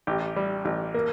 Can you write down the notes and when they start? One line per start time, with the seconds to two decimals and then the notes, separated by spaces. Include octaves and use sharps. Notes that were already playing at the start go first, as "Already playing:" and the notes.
0.07 A1 G4
0.36 G3
0.65 A1
0.94 A#3